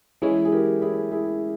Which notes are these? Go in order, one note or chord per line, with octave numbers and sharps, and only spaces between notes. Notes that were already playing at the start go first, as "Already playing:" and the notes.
E3 G#3 C#4 E4 G#4
G#4
G4 A#4
E4 G#4
E4 G#4